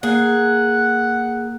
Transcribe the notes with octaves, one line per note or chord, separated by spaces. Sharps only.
A#3 G#4 F#5